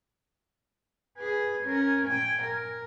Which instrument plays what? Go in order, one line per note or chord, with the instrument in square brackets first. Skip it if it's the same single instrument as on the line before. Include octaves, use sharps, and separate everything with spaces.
[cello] G#4 B4 [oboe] G#5
[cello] C#4 A#4
A#2 G5
A#4